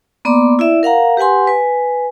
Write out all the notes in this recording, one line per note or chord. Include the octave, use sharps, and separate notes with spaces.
A#3 B3 D5 A#5 C6 D6
E4 D5 E5
A#4 F5 F#5 A#5
G4 B4 F#5 G#5 C6
B4 G#5